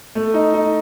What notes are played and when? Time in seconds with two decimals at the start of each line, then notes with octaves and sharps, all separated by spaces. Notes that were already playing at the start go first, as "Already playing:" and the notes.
0.15 A3
0.34 D#4
0.54 D#4